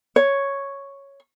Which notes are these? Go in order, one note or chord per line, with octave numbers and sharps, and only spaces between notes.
C#5